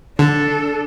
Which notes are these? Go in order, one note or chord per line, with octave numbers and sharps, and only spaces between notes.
D3 D4 A4